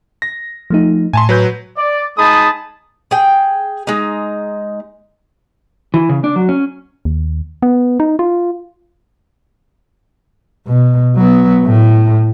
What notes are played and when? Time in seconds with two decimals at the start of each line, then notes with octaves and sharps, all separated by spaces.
0.22 A#6
0.70 F3 A3 D#4
1.13 A2 G#5 A5 C6
1.29 F#3 B4 G6
1.78 D5
2.18 G#3 D#4 G#4 A5 B5 D#6
3.11 G#4 G5
3.87 G#3 D#4
5.94 E3
6.09 C#3
6.24 D4
6.36 F#3
6.49 C#4
7.05 D#2
7.62 B3
8.00 D#4
8.19 F4
10.67 B2
11.16 F#3 B3
11.65 A2